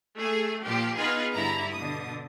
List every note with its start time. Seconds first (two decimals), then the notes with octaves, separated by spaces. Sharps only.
0.18 A3 G#4
0.65 A#2 F3 G4
0.97 B3 D#4 F4 G#4 B4
1.34 G2 D3 E4 A#5
1.73 B2 D3 D#6